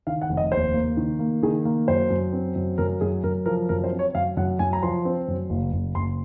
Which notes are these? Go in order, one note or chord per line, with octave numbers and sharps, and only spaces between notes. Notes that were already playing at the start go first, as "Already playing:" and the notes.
D#3 F5
F#5
F1
D#5
D#2 C5
A#3
D#3
A#3
D#3 G#4
A#3
F#2 C5
F#2
C4
F#2
F#2 A#4
F#2 G#4
F#2 A#4
F3 A#4
F#2 A#4
C5
C4
C#5
F#2 F5
F#2 F#5
F#2 G#5
A#5
F3 C6
C4
F#2
F#1
F#1
F#1 C6